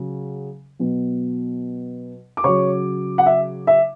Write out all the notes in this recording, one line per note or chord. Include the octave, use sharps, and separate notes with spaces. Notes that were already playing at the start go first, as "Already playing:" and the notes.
Already playing: C#3 F#3
B2 F#3
D6
C#3 F#3 C#5 C#6
F#5
E5
E5